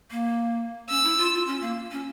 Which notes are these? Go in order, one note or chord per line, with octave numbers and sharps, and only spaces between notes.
A#3
C#4 E6
E4
F4
F4
C#4
A#3
C#4